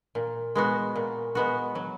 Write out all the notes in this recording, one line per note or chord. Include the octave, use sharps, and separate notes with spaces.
A#2
G#3 B3 F#4
A#2
G#3 B3 F#4
F#3